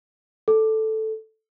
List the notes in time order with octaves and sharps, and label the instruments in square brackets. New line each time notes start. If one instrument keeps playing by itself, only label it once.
[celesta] A4